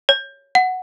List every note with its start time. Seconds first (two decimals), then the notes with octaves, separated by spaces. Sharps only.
0.09 C#5
0.55 F#5